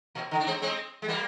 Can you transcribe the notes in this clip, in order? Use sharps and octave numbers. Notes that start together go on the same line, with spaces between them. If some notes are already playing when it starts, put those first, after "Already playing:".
A#2
D3
D4
G#3 C4
G#3 C4
G#3
G3 A#3